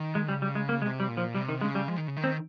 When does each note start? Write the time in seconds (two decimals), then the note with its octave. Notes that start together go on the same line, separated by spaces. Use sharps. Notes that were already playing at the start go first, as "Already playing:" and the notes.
Already playing: D#3
0.15 G#3
0.28 C#3 G3
0.42 G3
0.55 G#3
0.69 A#3
0.82 C3 G#3
1.00 G3
1.08 A#2
1.17 F3
1.35 C3 G3
1.49 D#3
1.61 C#3 G#3
1.75 G3
1.88 F3 G#3
1.98 D#3
2.07 C#3
2.16 D#3
2.24 C4